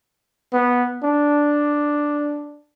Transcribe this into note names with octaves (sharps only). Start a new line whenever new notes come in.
B3
D4